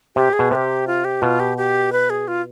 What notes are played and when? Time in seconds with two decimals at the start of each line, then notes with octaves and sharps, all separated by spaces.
0.16 C3 G4
0.33 G#4
0.39 B2
0.51 C3 B4
0.55 G4
0.87 F4
1.05 G4
1.22 B2 F4
1.40 G4
1.57 G4
1.92 B4
2.10 G#4
2.28 F4